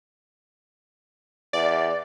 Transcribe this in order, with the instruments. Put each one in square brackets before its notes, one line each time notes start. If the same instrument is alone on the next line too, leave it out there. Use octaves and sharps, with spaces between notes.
[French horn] E2 [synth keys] D5